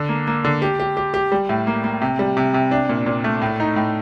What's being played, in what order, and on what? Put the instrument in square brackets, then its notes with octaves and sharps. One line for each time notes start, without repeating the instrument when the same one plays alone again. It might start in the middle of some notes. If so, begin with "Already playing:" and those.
Already playing: [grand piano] D3
A#3
A#3
D3
G4
G4
G4
G4
G3
A2
A#3
A#3
C3
G3
C3
C3
D4
A#2
A#2
A3
A2
D#4
A2